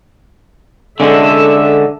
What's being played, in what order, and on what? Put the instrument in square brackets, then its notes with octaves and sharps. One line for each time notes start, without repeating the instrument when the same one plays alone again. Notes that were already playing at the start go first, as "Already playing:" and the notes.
[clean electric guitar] D3 G#3 C#4 [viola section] D4 A4 E5